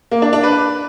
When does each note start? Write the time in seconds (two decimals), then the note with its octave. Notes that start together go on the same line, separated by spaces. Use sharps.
0.11 A#3
0.22 D4
0.33 D4
0.43 B4